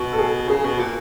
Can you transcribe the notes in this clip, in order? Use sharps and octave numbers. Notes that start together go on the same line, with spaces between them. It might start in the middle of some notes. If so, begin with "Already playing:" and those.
Already playing: B2
A4
G#4
C#3 G#4
B2
A#2